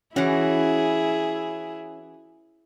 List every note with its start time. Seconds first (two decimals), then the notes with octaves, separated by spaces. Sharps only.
0.16 E3 C#4 E4 F#4 G#4 C#5